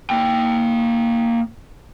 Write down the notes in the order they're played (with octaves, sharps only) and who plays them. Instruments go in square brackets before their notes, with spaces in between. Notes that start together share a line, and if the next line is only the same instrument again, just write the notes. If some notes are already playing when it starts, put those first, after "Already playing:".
[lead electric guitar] A#3 G5